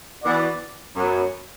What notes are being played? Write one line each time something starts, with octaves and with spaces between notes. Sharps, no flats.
E3 B3 F#4 D5
F#2 F#3 B3